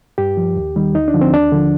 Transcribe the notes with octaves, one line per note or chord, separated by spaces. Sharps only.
G2 G4
F3
D#2
D#3 G3
D2 D#4
D4
D3 F3
C4
D#2 D4
D3 F3